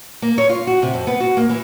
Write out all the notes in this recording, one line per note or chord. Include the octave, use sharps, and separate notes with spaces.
A#3
C#5
F4
F#4
C3
F2
B3
F#4
A#3
E3